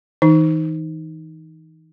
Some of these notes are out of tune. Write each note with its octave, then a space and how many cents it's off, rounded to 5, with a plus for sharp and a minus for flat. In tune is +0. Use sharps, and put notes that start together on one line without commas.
E3 -35 D#4 +0